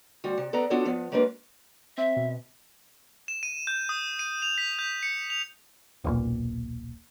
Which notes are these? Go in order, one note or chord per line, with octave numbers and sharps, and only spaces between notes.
D2 G3 F#4
C3
B3 A4 B4 D5 A#5
B3 D4 F4 F#4 A4 C#5
F3 B3
F#3 G#3 A#3 D4 B4
C4 E5
B2
E7
D#7
G6
D#6
D#7
F7
B6
G6
C#7
F7
D#1 B1 A#2